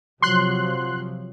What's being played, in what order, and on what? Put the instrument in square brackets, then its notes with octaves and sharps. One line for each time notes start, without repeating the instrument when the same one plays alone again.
[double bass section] C3 F3 F#3 [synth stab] C6 F#6